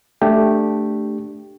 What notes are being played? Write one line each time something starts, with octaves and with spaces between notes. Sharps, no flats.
A3 D4 G4